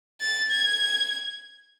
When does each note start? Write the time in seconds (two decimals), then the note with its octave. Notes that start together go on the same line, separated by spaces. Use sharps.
0.21 A6
0.51 G#6